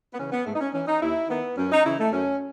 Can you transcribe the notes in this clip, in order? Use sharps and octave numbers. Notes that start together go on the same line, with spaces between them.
B3
C#3 E3 C#4
B3
G#2 A3
D#4
C#4
E3 C#4
D#4
D#2 E4
D#3 B3
F#2 C#4
D#4
C#3 E3 E4
A3
F#2 C#4